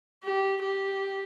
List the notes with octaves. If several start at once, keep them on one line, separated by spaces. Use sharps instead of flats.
G4
G4